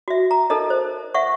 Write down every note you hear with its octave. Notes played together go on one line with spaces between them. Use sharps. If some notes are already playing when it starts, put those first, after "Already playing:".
F#4 E5
A#5
D#4 A4 A#4 D#5
C5
E5 F#5 C#6